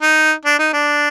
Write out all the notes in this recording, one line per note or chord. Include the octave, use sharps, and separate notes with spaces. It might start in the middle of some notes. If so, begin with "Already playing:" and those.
D#4
D4
D#4
D4